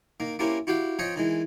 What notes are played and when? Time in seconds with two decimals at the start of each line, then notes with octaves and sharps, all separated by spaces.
0.20 D#3 A#3
0.39 A#3 C4 C#4 E4 G4 A#4
0.67 E4 F#4 G4 F5 G5
0.99 F3 C4 C#5 D#5 G5 C#6
1.16 D#3 E3 G#3